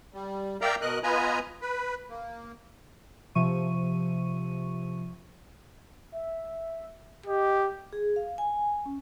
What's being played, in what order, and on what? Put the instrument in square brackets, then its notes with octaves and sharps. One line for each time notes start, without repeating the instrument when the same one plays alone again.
[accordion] G3
A#4 D5 E5 F5 G5 A#5
B2 A#4 D#5 F#6
B3 F4 B4 D#5 G#5 A#5
B4
A#3
[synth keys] C3 F3 E5 C#6 D#7
[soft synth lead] E5
[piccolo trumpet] G4 [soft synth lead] D#5
[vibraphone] G#4
F5
G#5
C#4